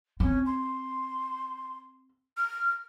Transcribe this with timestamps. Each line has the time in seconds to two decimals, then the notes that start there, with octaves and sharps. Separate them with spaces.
0.20 C4 C#4
0.46 C6
2.37 F6